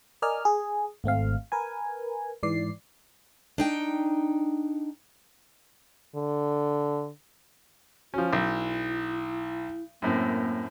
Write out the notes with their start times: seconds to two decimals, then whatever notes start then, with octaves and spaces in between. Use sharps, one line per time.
0.22 A#4 D5 D#5 G#5 F6
0.45 G#4
1.04 G#1 A3 C4 F5
1.52 A#4 B4 G#5
2.43 G#2 E3 D5 C7
3.58 D4 D#4 G5
6.16 D3
8.14 F3 C#4 F#4
8.33 B1 E4
10.02 F#2 A2 A#3 C4